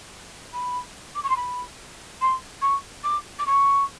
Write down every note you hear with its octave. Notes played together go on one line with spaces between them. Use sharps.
B5
D6
C#6
C6
B5
C6
C#6
D6
D6
C#6